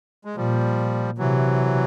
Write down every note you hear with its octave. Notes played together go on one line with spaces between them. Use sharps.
G#3
A#2 F3 G3
C3 E3 F#3